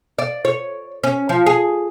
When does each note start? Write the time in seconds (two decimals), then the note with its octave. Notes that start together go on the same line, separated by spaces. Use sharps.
0.19 D5
0.45 C#5
1.04 C#4
1.29 F3
1.46 G#4